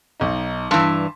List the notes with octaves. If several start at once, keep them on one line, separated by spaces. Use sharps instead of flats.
B1 D#4
G2 E3 A5 C6